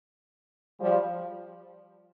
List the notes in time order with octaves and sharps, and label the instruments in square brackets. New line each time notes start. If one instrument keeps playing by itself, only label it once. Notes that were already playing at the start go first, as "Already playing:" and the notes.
[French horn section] F3 G3